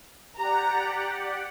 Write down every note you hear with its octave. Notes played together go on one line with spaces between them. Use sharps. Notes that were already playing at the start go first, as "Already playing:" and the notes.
G4 D5 F#5 A#5